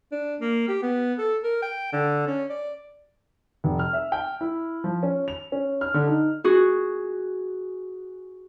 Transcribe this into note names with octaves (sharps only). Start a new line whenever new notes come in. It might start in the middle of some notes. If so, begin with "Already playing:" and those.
D4
A#3
G4
B3
A4
A#4
G5
D3
C#4
D5
F1
F6
E5
G5
E4
F3
C#4
F7
C#4
F6
D3
D#4
F#4 G#4